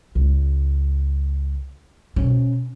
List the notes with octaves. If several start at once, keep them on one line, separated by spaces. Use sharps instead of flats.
C#2
B2 C#4